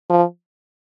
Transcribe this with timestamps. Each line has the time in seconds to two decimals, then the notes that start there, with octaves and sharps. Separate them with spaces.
0.10 F3